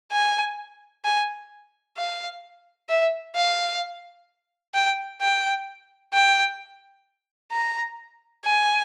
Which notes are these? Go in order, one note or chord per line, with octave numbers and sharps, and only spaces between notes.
G#5
G#5
F5
E5
F5
G5
G5
G5
A#5
G#5